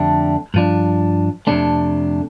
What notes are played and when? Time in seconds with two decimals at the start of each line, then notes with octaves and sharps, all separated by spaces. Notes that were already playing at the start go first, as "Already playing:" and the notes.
Already playing: F2 D3 A3 D4 G4
0.54 G2 F3 D4
1.47 F2 C3 A3 D4